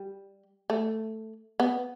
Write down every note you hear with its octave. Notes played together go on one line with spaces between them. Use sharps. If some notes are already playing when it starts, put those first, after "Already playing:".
Already playing: G3
A3
B3